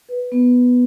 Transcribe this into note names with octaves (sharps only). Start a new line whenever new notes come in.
B4
B3